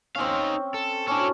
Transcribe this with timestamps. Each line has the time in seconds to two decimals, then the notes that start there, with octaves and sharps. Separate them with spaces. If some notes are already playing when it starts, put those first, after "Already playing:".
0.16 C4 C#4 D#4 F5
0.74 A4
1.08 C#4 D4 E4 F#4 A4